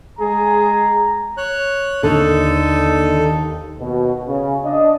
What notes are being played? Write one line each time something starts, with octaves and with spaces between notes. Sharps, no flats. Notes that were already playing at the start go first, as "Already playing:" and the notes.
G#3 G#4 A#5
C#5 F#6
D#2 D3 D#4 A4
D#2 B2
C#3
D4 D#5